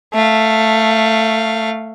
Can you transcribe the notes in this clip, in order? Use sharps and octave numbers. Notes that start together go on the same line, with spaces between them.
A3 F5